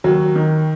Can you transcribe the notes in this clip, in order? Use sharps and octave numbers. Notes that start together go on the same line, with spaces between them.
D#2 F#3 F#4
D#3